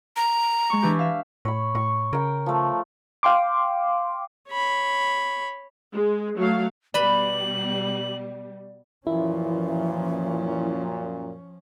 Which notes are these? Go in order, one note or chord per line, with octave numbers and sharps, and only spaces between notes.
A#5
G#3 C#6
E3 D4 G4
E5 F5
A2 C#5 B5
A2 C#6
C#3 A#4 G5
F3 A3
F5 G5 C6 D6
C#5 B5
G#3
F#3 A3 F5
B2 G3 B4 D5 B5 F#7
F#2 A#2 E3 F3 C#4 E4